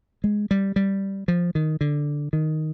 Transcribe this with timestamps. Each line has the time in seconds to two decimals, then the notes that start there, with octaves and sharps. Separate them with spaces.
0.24 G#3
0.51 G3
0.76 G3
1.28 F3
1.55 D#3
1.81 D3
2.33 D#3